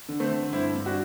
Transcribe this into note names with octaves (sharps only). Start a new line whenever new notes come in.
D3
A3 C4
D3
G2 C4 E4
G2
D4 F#4